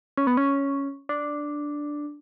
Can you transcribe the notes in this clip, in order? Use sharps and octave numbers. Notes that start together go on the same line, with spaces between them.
C#4
B3
C#4
D4